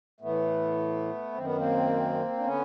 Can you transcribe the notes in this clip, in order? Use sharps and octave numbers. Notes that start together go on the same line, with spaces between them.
A2 E3 A3 B3
F#2 D#3 C4
B3
A#3 C4
D4
D3 B3 C#4